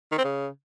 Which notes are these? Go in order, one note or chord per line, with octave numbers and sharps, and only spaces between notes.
D#3
C4
C#3